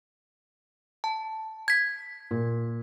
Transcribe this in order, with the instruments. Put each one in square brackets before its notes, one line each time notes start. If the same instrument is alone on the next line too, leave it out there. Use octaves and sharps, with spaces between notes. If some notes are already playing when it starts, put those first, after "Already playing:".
[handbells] A5
G#6 B6
[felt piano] A#2